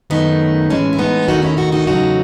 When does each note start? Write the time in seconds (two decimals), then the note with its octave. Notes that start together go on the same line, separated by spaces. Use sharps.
0.10 F#2 D#3 A3 B3 D#4
0.70 A2 E3 G#3 C#4
0.93 E4
0.99 B3 D#4
1.28 D#2 D#3 A3 D#4 F#4
1.42 C#4 E4
1.57 D#4 F#4
1.72 D#4 F#4
1.86 E2 C#3 F#3 A3 D#4 F#4